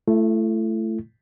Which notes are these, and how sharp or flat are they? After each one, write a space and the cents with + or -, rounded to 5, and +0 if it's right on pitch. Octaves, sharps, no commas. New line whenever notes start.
A3 +0 E4 +40